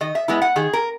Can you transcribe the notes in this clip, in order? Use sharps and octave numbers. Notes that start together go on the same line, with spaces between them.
D#3 D#5
E5
G#3 B3 E4 E5
F#5
D#3 G#4
A#4